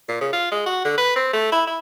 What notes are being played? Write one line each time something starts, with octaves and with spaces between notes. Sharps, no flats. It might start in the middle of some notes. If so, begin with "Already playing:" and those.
A#2
C#3
F4
G#3
F#4
D3
B4
C4
A3
E4
E4